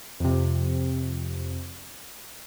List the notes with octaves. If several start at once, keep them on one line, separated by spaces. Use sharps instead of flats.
F2 C3